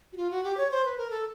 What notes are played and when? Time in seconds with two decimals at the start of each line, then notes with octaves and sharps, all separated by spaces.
0.13 F#4
0.17 F4
0.31 F#4
0.44 G4
0.57 C#5
0.71 C5
0.85 B4
0.98 A#4
1.10 A4